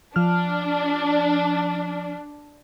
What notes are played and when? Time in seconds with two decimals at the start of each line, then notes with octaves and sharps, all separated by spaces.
0.16 F3 D4 F6